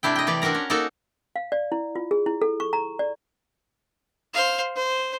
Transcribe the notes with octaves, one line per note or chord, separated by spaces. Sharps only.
C3 A3 D4 E4 G5
D#5 G5
E3 G4 D5
C4 D4 F#4 A#4 A#5
C#4
A#3 D#4 F#4 A4
F5
D5
E4
F4
G#4
E4
A4
C#6
A#5
D5
C5 F5
C5